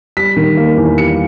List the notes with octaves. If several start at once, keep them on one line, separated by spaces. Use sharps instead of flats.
G3 B6
D#3
A#3
E2
G3 C#7